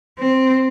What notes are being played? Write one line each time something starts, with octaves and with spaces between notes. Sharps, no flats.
C4